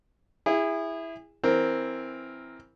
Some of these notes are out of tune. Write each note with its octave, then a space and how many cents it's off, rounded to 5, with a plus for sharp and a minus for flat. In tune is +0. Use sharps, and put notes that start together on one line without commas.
E4 +0 G#4 -30
E3 +0 C4 +0 A#4 +0